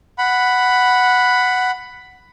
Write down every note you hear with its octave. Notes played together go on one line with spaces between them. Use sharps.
F#5 B5